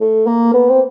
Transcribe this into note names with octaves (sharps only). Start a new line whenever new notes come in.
A3
A#3
B3
C4